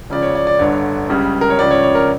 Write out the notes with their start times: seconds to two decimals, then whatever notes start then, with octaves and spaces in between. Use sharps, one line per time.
0.10 C#2 C#3 F3 D5
0.22 C#5
0.35 D5
0.47 D5
0.59 G1 G2 D3 C#5
1.09 C#2 C#3 G3
1.41 A#4
1.50 C#5
1.58 C#2 C#3 F3 D5
1.71 C#5
1.83 C#5
1.95 A#4